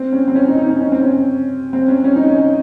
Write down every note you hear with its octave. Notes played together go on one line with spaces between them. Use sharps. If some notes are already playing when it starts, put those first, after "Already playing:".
Already playing: C4
C#4
C4
C#4
D#4
D#4
C#4
C#4
C4
C#4
C4
C#4
C#4
D#4
C#4